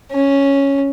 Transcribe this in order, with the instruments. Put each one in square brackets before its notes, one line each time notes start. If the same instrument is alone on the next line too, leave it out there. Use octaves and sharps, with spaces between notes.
[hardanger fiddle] C#4